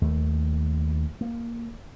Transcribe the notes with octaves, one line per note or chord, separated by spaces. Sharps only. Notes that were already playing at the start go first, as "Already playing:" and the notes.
D#2 A3
A#3